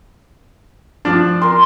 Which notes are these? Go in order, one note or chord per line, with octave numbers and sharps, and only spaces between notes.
F3 D4
A#4 C6